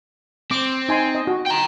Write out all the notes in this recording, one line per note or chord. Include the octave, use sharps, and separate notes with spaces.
C4 D6
D#4 G#5 C6
D#5
F#4
G5 A#5